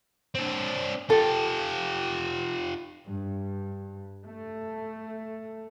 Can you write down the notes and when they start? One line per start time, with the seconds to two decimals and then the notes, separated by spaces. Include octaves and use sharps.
0.35 C4 D4
1.10 F4 G4 A4
3.07 G2
4.25 A3